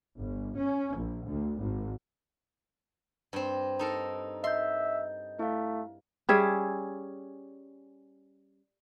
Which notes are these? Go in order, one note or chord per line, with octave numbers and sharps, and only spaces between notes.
G1
C#4
A#1
D2
G#1
G2 C4
D#4 A4 A#4
D#5 E5 C6 G6
A3 E4 F5
G3 C#4 G#4 E5